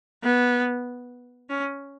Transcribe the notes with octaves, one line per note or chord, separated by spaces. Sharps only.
B3
C#4